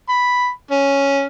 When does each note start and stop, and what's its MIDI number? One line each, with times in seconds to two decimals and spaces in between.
0.09 0.49 83
0.71 1.25 61